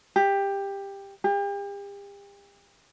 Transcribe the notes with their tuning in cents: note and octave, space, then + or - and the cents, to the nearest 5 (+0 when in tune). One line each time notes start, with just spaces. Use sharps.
G4 +15
G4 +40